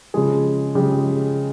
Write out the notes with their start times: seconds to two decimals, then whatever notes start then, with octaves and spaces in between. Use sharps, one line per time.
0.14 C#3 F3 G#3 G#4
0.75 C#3 F3 G#3 G4